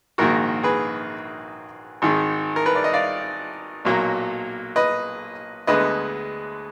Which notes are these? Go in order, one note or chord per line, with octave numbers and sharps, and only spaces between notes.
A#1 G#2 D#3 A#3 F#4 A#4
G#4 B4
G#1 G#2 D#3
A#4
B4
D5
D#5
D5 F5
B1 A#2 F#3 A#3
B4 D#5
D2 D3 G#3 B3 B4 D#5